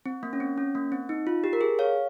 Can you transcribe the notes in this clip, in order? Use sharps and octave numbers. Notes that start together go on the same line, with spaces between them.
C4
A#3
C#4
C4
C#4
A#3
C4
D#4
F4
G4
A#4
G#4
C#5 F5